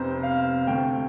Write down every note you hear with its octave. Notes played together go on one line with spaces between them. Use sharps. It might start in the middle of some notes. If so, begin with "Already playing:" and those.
Already playing: F1 F2 C3 C5
F5
D2 C3 A3 G5